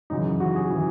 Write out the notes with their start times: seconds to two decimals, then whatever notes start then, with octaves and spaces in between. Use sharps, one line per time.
0.10 F#2 C#3 E3 D#4
0.40 F#4
0.56 G#4
0.70 C#3 E3